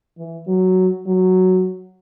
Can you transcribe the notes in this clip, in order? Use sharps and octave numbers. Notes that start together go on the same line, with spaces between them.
E3
F#3
F#3